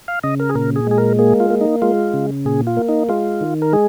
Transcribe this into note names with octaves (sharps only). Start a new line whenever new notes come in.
F5
C#3 D#5
A#4
G#4
A#2 A#4
G#4
G#3 G#4
A#4
A#3 G#4
F4
A#3
D#4
G#3 F4
C#3
A#2 G#4
F4
A#3
D#4
G#3 F4
D#3
A#4
G#3 G#4